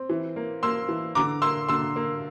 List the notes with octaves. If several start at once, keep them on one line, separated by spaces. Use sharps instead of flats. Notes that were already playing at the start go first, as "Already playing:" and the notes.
Already playing: C4
E3
A#3
A#3 C6 E6
E3
D3 A#5 D6
A#3 C6 E6
D3 C6 E6
A#3